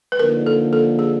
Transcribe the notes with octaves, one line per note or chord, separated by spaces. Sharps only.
B4
D3 F3 A#3 D#4 A#4
A4
A4
G#4